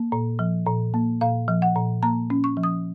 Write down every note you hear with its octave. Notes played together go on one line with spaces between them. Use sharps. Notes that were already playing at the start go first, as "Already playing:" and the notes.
Already playing: A#3
A#2
F3
A#2
A#3
A#2 F5
F3
F#5
A#2
A#3 A#5
C#4
C#6
F3
D#6